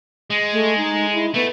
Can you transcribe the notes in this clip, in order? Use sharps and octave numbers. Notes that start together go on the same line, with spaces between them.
G#3
A3
D#4
E4
A3 B3